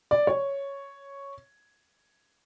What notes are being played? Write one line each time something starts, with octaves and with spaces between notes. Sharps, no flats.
D5
C#5